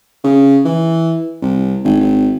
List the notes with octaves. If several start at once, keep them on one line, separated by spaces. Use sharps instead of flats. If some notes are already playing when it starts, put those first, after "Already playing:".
C#3
E3
C2
G#1
G#1